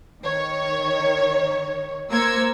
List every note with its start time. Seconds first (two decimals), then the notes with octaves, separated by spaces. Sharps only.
0.21 D#3 C#5
2.09 A#3 A#4 C5 E6 G#6 C#7